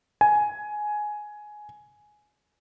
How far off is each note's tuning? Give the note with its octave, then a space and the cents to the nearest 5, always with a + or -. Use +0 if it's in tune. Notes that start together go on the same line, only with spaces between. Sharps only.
G#5 +10